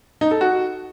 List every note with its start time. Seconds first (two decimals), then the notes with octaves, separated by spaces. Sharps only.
0.21 D#4
0.31 A4
0.41 F#4